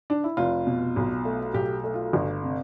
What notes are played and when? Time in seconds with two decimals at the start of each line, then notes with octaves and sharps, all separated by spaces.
0.10 D4
0.24 E4
0.37 F1 F4
0.67 B2
0.96 B1
1.25 A3
1.54 B1 G4
1.84 A3
1.94 F4
2.13 G1
2.42 C3